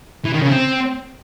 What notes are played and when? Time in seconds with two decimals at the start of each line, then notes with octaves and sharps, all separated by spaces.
0.25 E3
0.33 D#3
0.41 C#3
0.50 C4